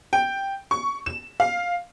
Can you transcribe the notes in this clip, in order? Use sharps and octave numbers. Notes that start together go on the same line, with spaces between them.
G5
C#6
E7
F5